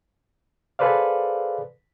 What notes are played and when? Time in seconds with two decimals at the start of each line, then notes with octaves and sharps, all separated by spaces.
0.79 G#4 A4 B4 C5 D5 F5